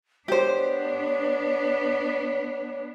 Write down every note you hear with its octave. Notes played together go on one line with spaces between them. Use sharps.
B3 D4 G4 C5 C#5